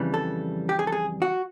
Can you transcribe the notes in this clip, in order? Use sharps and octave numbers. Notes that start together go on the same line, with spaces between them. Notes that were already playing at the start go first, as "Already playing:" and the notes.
Already playing: F2 C#3 E3 G3
A4
G4
G#4
A4
G#4
F#4